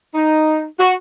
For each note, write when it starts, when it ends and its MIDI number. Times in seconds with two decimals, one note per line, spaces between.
0.15 0.63 63
0.78 0.93 66